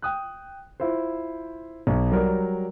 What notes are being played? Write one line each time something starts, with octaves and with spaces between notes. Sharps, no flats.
G5 D#6 F#6
E4 F4 C5
B1
F#3 G3 A#4 D5